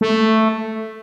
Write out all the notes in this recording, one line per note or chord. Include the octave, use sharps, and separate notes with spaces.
A3